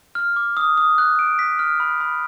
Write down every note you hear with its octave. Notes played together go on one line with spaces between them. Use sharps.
F6
D6
D#6
D#6
F#6
D7
B6
F6
B5
B5